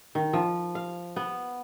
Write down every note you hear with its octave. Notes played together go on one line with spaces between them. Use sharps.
D#3
F3
F5
B3